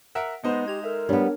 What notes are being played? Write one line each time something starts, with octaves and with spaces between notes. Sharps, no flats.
A#4 E5 F#5
G#3 B3 D#4 C5
G4 G#6 F7
A4 A#4 E5
G3 B3 D4 G4 C#5